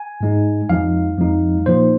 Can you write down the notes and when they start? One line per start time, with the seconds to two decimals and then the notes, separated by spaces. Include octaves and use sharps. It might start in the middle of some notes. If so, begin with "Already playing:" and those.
Already playing: G#5
0.21 G#2 G#3 D#4
0.69 F2 F3 G#3 D#4 F5
1.17 F2 F3 G#3 D#4
1.66 A#2 F3 A#3 D#4 C5